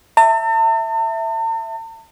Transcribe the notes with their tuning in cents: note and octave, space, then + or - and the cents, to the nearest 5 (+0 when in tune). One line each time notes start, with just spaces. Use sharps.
E5 +0 A5 +45